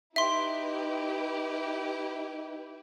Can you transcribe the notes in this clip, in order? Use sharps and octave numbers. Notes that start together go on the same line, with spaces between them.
D#4 E4 G4 B4 E5 C6